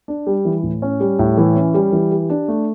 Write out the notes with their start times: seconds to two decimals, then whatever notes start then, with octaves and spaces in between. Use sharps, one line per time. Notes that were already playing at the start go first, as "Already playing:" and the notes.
0.08 D4
0.27 G3
0.45 E3
0.63 A2
0.82 C#4
1.00 G3
1.19 A2
1.37 E3
1.56 C#4
1.74 G3
1.92 E3
2.11 G4
2.30 D4
2.48 A3